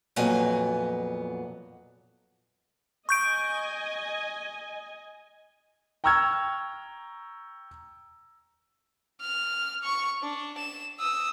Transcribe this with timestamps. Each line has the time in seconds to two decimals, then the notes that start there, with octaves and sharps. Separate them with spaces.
0.16 F2 A#2 F#3 B3 D#5 G#5
3.09 D#5 G#5 C#6 G6 D7
6.04 G5 A#5 C#6 E6 F6 G#6
9.20 F6
9.83 C#6
10.22 D4
10.57 E7
10.99 D#6 E6